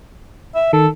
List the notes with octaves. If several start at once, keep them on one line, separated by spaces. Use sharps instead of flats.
E5
D#3 A4